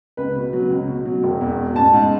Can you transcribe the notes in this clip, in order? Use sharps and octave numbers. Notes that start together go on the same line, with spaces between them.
C#2 B4
B2
F#3
C#2
B2
F#3
E1
E2
B2
A1 A5
G#2